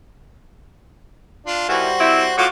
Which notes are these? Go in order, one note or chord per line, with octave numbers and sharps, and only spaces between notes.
D4 F4
B2 D#3 E3 G3 F#4 C5
C4 E4
A2 F4 F#4 D6